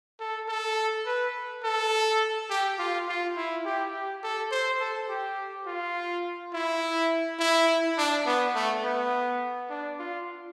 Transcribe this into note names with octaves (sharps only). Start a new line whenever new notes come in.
A4
A4
B4
A4
G4
F4
F4
E4
G4
G4
A4
C5
A4
G4
F4
E4
E4
D4
B3
A3
B3
D4
F4